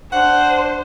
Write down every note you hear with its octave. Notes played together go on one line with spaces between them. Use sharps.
D4 C5 F#5